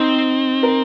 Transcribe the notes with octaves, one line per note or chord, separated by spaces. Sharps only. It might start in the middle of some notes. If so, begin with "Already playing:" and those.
Already playing: C4 D#4
A#4